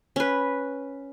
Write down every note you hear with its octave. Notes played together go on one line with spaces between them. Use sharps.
C#4 B4